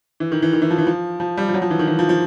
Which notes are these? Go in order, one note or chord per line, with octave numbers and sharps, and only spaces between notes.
E3
D#3
E3
D#3
E3
F3
E3
F3
F3
G3
F3
F#3
F3
E3
D#3
E3
F3
F3